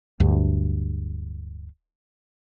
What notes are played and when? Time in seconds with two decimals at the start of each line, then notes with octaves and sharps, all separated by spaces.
0.20 D1 D2 G2